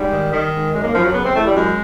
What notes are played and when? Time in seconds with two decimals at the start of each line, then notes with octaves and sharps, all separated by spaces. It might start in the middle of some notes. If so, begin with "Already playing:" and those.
Already playing: G#2 G3
0.12 D#3
0.33 D#3
0.52 G#2
0.73 F#2 G#3
0.83 A#3
0.94 F#2 F3
1.04 F#3
1.14 C#3 B3
1.24 C4
1.34 E3 A3
1.45 G3
1.54 F#2 G#3